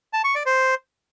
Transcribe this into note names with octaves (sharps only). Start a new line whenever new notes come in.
A5
C#6
D5
C5